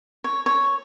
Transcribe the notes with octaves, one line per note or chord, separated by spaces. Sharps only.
C#5
C#5